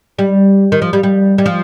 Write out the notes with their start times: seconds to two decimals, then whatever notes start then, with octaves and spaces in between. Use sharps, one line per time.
0.19 G3
0.72 D#3
0.82 F3
0.93 G3
1.03 G3
1.38 G3
1.46 F3